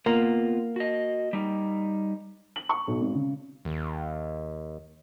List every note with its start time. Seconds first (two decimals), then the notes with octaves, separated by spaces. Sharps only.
0.06 A#3 B3 F4
0.76 F#4 D#5
1.33 G3 D#4
2.56 F#7
2.69 C#6
2.87 B1
3.01 G#1
3.15 C#3
3.65 D#2